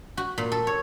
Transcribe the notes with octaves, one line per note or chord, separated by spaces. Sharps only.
F#4
A#2
A4
C#5